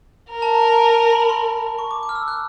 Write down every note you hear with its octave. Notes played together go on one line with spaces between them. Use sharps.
A#4
A5
A#5
A5
G#5
A#5
B5
C6
C#6
D6
D6
F6
E6
F#6